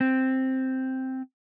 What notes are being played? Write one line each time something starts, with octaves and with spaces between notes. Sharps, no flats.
C4